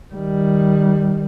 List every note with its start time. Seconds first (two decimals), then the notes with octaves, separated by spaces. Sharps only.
0.14 D#3 G3